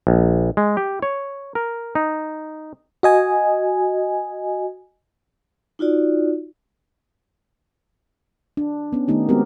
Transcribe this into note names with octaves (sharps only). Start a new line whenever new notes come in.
A#1
G#3
G4
C#5
A#4
D#4
F#4 D#5 G#5
D#4 F4 F#4 D5
D4
B3 C#4
D#3 A3 B3 D#4 G4
G#3 B3 C4 F#4 G4 A#4